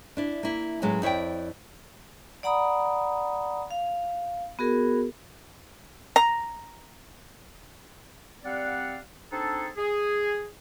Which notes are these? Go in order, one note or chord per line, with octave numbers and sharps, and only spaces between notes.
D4 E4
A#3 E4
A2 F#3 G#3 B3 C#4
F2 E4 C#5 D5 G5
D5 F#5 A#5 B5 D#6
F5
B3 F#4 G#4 A#4
A#5
G3 C4 D5 F5 F#5
C4 D4 D#4 G#4 A4
G#4